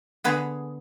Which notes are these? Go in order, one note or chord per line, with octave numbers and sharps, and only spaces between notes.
D3 B3 G#4